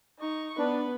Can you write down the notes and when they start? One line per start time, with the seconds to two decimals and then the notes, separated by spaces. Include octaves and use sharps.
0.19 D#4 C#6
0.58 B3 D4 B4